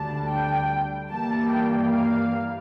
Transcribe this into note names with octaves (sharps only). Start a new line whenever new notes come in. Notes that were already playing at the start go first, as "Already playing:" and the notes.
Already playing: D2 D3 G3 D4 A5
G5
G2 E3 G3 A#3 A5
G5
F5